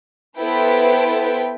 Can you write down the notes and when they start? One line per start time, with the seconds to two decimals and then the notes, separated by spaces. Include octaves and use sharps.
0.39 B3 E4 A4 B4 C5 G5